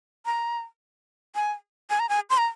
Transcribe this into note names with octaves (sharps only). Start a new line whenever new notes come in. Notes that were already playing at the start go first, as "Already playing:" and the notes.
A#5
G#5
G#5
A#5
G#5
C6
A#5